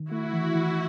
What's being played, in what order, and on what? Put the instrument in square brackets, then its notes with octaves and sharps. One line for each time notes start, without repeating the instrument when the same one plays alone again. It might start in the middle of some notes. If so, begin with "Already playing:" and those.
Already playing: [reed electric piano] D#3
[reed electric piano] A3 [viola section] E4 F#4
[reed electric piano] E3
E3